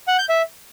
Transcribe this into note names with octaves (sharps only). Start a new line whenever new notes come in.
F#5
G6
E5